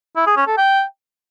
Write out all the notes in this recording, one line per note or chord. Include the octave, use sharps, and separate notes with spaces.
E4
G#4
C#4
A4
G5